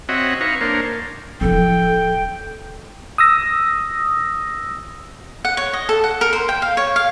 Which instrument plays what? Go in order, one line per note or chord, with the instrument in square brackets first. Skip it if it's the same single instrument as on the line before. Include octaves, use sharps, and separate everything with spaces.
[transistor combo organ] C4 F#4 C#5 D#5 E5 F#5
D#4 B4 F5 A#5 C#6
A#3 D4 A#4 C5 C#5
[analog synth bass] D1 [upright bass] F3 E4 [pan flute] A4 [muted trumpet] G5
[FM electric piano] D#6 E6 A#6
[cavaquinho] F#5
C#5
D#5
A4
F#5
A#4
C5
G5
F5
C#5
F5